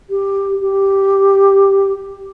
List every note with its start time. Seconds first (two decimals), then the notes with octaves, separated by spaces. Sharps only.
0.10 G4
0.61 G4